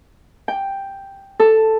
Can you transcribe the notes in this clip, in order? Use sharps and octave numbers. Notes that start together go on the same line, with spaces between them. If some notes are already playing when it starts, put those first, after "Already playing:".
G5
A4